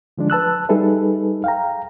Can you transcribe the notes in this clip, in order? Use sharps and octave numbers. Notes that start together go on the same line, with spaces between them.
D3 F3 G#3 D4
B4 A5 E6 F#6
G3 D#4 G#4 A4 B4 E5
F5 G5 A#5